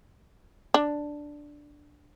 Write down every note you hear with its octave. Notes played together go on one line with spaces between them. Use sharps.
D4